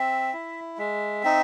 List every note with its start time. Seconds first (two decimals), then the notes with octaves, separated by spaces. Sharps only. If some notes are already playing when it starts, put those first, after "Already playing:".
Already playing: C4 E5
0.33 E4
0.78 G#3 E5
1.24 C4 D#4